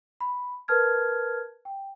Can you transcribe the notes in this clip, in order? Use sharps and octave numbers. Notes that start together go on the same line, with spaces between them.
B5
A#4 B4 A5 F6 G#6
G5